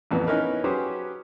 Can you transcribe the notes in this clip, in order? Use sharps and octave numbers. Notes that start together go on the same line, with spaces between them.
A1 F2 A#2 B3
B3 C#4 D#4 E4 A#4 B4
F#3 C#4 G4 G#4 B4 C5